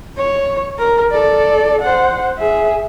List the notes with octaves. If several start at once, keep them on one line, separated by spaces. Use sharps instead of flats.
C#5
A#4
A4 D5
C5 F#5
G#4 E5